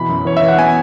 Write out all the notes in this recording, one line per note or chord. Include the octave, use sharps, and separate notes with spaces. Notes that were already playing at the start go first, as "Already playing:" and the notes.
Already playing: B2 E3 B5
F#2
E3 C#5
E5
E3
F#5
B3 G#5